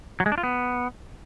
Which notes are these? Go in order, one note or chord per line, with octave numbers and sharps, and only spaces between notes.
F#3
G#3
D4
F4
B3